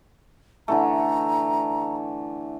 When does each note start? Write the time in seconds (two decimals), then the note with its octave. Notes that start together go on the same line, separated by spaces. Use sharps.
0.68 D3 E3 A3 A#5